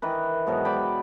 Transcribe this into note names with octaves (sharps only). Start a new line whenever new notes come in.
D#3 E3 B4
G#2 B2 F#3
D5 G5 B5